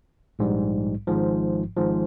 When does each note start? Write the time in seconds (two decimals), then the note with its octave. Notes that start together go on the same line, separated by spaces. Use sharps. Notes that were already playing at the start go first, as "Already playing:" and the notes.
0.39 A#1 G#2 G3
1.07 G#1 G#2 F3
1.76 G#1 G#2 F3